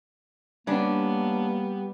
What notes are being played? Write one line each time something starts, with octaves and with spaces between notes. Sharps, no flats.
G3 A#3 B3 C#4 D4